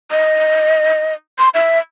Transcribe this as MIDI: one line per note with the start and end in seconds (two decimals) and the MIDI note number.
0.11 1.13 75
1.39 1.49 84
1.54 1.79 76